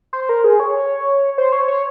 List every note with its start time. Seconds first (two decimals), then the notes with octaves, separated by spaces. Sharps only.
0.13 C5
0.29 A#4
0.44 G#4
0.60 C#5
1.38 C5
1.53 C#5
1.68 C#5